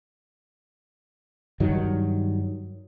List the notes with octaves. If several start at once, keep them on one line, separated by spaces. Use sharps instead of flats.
G2 D#3 F#3